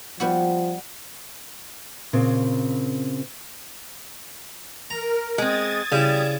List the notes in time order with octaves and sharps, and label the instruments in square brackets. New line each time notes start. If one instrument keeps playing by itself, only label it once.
[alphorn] F3 [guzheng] G3 B3 F#4
[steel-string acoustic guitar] A#2 C#3 C4
[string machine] A#4 [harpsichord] A#5
[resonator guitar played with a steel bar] G#3 C4 [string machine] D#6 G#6 A6
[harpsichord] C#3 E4 [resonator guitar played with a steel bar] G3